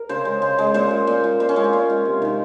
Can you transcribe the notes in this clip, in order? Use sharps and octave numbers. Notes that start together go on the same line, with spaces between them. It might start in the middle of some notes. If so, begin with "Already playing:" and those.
Already playing: A#4
C#3 C5
G#3
C#3
G#3
A#2 C5
G#3
A#2
G#3
A#2 C5
C#4
G#3
F4
A#2
G#3
C3
D#3 G#3